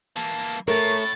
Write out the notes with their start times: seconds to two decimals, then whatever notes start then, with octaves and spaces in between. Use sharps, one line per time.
0.16 E3 A#3 A5
0.68 A2 A3 A#4 C#5 A6